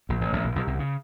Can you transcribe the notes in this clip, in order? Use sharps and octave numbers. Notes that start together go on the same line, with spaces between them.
A#1 A#2
A1 A2
A1 A2
A#1 A#2
B1 B2
C2 C3
C#3